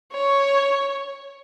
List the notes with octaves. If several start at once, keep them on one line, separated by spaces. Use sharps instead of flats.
C#5